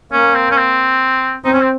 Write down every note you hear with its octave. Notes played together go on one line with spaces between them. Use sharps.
A#3 C#4
C4
C#4
C4
C4 D#4
C#4
C4